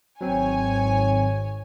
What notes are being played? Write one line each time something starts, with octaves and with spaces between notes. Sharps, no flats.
G#1 F#3 C4 C#5 G#5